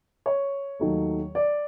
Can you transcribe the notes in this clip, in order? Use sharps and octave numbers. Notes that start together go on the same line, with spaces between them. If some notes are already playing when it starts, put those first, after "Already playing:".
C#5
D#2 D#3 F#3 A3
D5